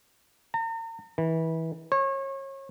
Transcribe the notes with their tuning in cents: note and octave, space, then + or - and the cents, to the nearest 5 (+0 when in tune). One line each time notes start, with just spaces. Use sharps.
A#5 -40
E3 -25
C#5 -30